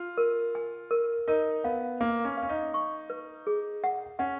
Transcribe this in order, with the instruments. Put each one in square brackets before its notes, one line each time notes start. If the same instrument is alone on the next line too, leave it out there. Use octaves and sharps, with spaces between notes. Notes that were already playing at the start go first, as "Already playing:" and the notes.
Already playing: [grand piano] F4
[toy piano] A#4
G#5
A#4
[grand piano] D#4 [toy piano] A#4
[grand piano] B3 [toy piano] F5
[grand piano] A#3 [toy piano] F5
[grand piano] C#4
[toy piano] F5
[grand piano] C#4
D#4
[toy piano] C#6
B4
G#4
F#5
[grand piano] C#4 [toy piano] F#5